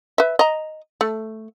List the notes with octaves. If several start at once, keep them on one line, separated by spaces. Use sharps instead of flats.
B4 E5
D#5 A#5
A3